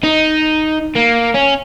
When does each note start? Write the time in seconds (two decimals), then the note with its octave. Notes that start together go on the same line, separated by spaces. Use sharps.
0.03 D#4
0.95 A#3
1.34 C#4